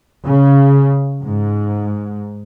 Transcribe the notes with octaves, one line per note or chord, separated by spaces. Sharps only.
C#3
G#2